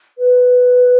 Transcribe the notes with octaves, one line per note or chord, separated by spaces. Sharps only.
B4